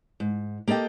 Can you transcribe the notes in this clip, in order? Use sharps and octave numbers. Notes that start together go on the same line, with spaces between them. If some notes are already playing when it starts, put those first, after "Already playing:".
G#2
A#3 G4 A4 D#5 G5